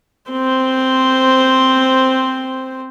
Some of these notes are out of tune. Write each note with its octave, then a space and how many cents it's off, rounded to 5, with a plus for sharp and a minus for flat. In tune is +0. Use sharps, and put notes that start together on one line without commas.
C4 +0 C5 -5